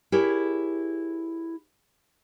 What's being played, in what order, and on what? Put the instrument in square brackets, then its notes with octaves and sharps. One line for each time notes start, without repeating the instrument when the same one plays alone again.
[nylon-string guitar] E4 G4 G#4 A#4 C#5